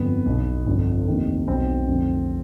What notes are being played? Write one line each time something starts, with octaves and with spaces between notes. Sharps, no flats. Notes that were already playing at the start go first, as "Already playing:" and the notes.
Already playing: G1 F2 D3 B3
B1 B2
G1 F2 D3
F1 D#2 D#3
B1 B2 C4
F1 F2 D3